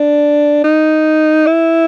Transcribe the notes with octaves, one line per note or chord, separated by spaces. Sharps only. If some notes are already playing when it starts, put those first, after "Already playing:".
Already playing: D4
D#4
E4